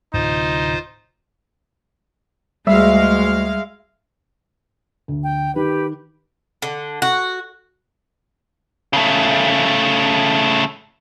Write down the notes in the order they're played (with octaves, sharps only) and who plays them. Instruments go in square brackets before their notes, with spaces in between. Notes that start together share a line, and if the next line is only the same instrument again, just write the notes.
[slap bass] D1 A2 C3 [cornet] D#4 [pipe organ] F4 C5
[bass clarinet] D2 [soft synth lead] G3 [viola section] G#3 F5 [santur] E5
[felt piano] D2
[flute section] G5
[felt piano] D#3 [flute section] G4 B4
[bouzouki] D3
F#4
[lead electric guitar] C#3 A3